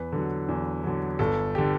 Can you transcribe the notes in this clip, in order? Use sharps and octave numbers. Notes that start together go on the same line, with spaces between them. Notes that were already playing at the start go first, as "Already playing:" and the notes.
Already playing: E2 B4
D3 F#3
E2
D3 F#3
G1 A4
D3 G4